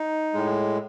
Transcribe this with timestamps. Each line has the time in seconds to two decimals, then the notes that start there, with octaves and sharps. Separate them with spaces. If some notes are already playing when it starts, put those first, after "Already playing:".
Already playing: D#4
0.34 A2 G#3